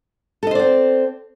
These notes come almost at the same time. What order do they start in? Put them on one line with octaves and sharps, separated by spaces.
A4 D#5 C5 D5 C4